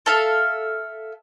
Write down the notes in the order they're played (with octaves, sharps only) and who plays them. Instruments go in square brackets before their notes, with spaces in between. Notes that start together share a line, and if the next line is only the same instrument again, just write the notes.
[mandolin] A4 E5 F5